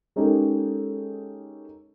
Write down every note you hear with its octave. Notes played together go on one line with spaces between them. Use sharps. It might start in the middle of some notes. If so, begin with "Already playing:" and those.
G#3 C#4 D#4 G4 A4 A#4